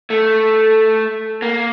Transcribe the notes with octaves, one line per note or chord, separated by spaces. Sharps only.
A3
A#3